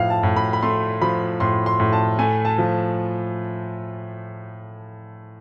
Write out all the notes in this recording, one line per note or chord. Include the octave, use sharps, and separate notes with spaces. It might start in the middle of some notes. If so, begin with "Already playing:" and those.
Already playing: A2 F3 F5
A5
A2
B5
B5
A3 C6
F3 B5
A2 C6
C6
A2
A5
A3 G#5
A5
F3